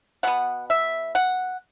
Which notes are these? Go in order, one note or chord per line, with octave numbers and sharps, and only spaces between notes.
B2 B3 F#5
E5
F#5